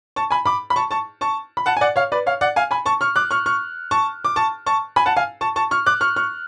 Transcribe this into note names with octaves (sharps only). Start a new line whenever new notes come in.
A5 C#6
G#5 B5
B5 D6
B5
A5 C#6
A5 C#6
A5 C#6
B5
F#5 A5
G#5
D5 F#5
C#5 F5
B4 D5
C#5 F5
D5 F#5
F5 G#5
G#5 B5
A5 C#6
C#6 F6
D6 F#6
C#6 F6
C#6 F6
A5 C#6
D6
A5 C#6
A5 C#6
G#5 B5
F#5 A5
F5 G#5
A5 C#6
A5 C#6
C#6 F6
D6 F#6
C#6 F6
C#6 F6